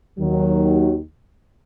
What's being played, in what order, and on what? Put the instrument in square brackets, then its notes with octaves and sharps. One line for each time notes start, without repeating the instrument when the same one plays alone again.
[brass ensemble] D#2 D#3 F#3